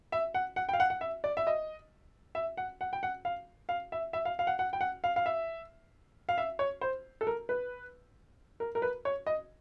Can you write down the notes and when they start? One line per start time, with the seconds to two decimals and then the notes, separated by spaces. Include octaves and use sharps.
0.12 E5
0.34 F#5
0.56 F#5
0.69 G5
0.73 F5
0.80 F#5
0.90 F#5
1.01 E5
1.24 D5
1.37 E5
1.47 D#5
2.35 E5
2.57 F#5
2.81 F#5
2.93 G5
3.03 F#5
3.25 F5
3.69 F5
3.92 E5
4.13 E5
4.25 F5
4.39 F5
4.47 F#5
4.59 F#5
4.73 G5
4.81 F#5
5.04 F5
5.16 F5
5.26 E5
6.29 F5
6.38 E5
6.59 C#5
6.81 C5
7.21 A4
7.27 A#4
7.49 B4
8.60 A#4
8.75 A#4
8.82 B4
9.05 C#5
9.27 D#5